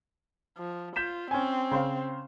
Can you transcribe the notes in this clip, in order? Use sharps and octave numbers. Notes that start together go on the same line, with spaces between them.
F3
F4 G6 B6 E7
C4 C#4 G#5
C#3 C5 F5